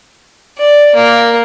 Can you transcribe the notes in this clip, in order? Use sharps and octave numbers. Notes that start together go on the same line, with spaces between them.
D5
A#3